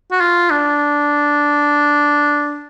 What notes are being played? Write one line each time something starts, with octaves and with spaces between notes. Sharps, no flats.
F#4
F4
D4